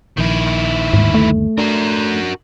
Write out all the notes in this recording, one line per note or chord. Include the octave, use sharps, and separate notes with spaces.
A#1 D#3 E4
G1 D#2 G#2
A3
D4 F#4 A#4